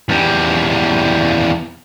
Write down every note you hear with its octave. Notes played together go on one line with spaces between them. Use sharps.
E2 G3